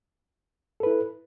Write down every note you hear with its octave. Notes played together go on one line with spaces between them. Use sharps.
E4 A4 B4